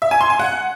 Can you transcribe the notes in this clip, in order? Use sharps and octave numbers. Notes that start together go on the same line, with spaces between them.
E5
G#5
C6
G#5
F#5